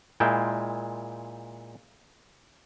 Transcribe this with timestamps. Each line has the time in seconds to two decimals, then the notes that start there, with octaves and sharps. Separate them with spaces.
0.20 A#2 G#3 E4 F4 G5